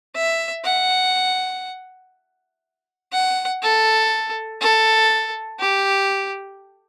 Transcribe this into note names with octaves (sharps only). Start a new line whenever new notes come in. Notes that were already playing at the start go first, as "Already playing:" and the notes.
E5
F#5
F#5
A4
A4
G4